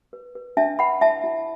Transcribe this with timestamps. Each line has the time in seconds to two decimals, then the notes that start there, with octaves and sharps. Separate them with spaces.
0.13 B4
0.35 B4
0.57 D4 E5 A5
0.79 B4 F#5 B5
1.01 E4 E5 A5
1.24 E4